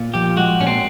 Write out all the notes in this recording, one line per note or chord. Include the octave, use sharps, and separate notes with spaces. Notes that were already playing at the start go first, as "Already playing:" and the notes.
Already playing: A#2
F3 G4
G#3 F#4
A#2 C#4
C4